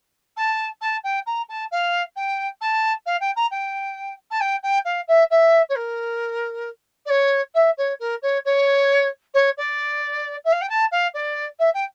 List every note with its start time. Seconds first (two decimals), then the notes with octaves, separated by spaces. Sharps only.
0.36 A5
0.81 A5
1.03 G5
1.26 A#5
1.48 A5
1.71 F5
2.16 G5
2.61 A5
3.06 F5
3.20 G5
3.35 A#5
3.51 G5
4.30 A5
4.40 G5
4.63 G5
4.85 F5
5.07 E5
5.30 E5
5.69 C#5
5.75 A#4
7.05 D5
7.09 C#5
7.54 E5
7.77 C#5
7.99 A#4
8.22 C#5
8.45 C#5
9.34 C#5
9.57 D5
10.44 E5
10.52 F5
10.61 G5
10.69 A5
10.91 F5
11.14 D5
11.59 E5
11.74 G5